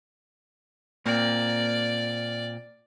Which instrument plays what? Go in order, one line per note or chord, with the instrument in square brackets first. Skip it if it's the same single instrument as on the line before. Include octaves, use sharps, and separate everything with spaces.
[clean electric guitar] A#2 A#3 C4 [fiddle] D5